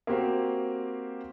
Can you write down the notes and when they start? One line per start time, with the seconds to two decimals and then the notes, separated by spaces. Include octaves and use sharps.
0.07 A#3 C4 F#4 G4 C5